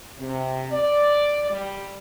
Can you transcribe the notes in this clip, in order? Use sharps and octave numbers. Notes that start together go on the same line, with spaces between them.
C3
D5
G3